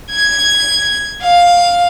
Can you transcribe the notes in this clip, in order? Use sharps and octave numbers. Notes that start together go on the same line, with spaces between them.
G#6
F5